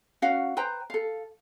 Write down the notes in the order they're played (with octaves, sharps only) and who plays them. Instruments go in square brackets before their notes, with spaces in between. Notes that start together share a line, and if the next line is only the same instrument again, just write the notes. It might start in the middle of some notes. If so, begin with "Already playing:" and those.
[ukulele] C#4 F#4 F5 F#5
B4 C5 G5 A#5
A4 F5